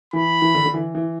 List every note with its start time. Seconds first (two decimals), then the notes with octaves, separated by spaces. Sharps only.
0.13 E3 B5
0.42 E3
0.55 D3
0.66 D3
0.74 E3
0.95 E3